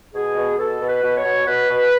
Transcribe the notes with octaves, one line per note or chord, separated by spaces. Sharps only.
B2 G#4
B2
B2 A4
B2
B4
B2
C#5
B2
B2 B4
B2